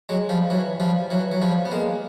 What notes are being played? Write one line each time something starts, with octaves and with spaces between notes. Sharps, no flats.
F#3 G#3
F3 G3
E3 F#3
F3 G3
E3 F#3
F#3
F3 G3
B3
G#3 A#3